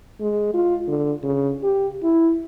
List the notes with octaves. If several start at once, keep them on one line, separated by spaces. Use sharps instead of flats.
G#3
F4
D3
C#3
G4
E4